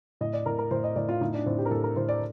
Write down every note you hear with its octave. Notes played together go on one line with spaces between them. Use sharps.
A2 D#5
D5
A2 A#4
A#4
A2 C5
D#5
A2 D5
F4
A2 D#4
D4
A2 C4
G4
A#4
A2 A4
A#4
A2 C5
D5